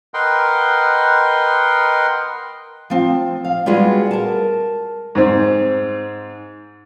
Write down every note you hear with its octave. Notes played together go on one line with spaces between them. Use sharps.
A#4 B4 D#5 F#5 G5 C6
F3 C4
F5
G3 G#3 B3 F4 F#4 G#4
A#4 A5
G#2 C4